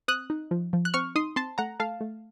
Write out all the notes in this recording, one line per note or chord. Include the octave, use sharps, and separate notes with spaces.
C4 D#6 F#6
D#4
F3
F3
F#6
C4 C#6 F6
D#4 C6 D#6
C4 A5 C6
A3 F#5 A#5
A3 F5 A5
A3